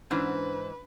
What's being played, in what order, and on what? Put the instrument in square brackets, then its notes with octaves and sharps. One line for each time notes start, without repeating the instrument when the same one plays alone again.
[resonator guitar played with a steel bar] G#2 E3 [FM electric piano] C#4 D4 [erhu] B4 [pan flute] C5